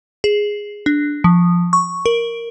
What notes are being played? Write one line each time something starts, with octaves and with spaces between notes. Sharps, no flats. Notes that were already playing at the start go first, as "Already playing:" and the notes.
G#4
D4
F3
C#6
A#4